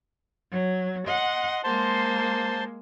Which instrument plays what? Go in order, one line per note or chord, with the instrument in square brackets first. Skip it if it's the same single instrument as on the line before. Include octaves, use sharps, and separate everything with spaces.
[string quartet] F#3
[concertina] D#5 C6 [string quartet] F#5
[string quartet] G#3 A#3 [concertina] C5 A5 C6